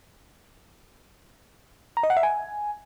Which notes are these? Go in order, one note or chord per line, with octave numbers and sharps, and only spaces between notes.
A#5
D#5
F#5
E5
G#5